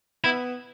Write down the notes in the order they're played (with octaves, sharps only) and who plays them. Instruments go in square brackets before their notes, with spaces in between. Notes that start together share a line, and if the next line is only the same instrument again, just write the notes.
[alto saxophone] B3 [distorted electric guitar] E4